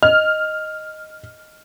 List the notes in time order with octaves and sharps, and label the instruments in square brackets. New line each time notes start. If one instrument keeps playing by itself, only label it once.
[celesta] D#5 [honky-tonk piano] F6